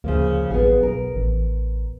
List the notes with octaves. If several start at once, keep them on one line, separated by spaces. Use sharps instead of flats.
D2 C#3 F3 A#3
A1 B3 F4 G#4
B1 A#4
A1